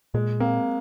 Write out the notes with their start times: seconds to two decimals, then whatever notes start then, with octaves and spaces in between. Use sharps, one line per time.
0.14 A#2 G#3
0.40 A#3 C4